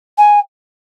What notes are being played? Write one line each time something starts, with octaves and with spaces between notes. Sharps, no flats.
G#5